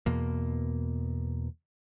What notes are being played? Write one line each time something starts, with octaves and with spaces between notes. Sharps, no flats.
E2 B2 A#3